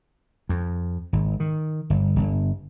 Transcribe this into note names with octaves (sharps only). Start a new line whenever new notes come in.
F2
G#1
D#3
G1
G1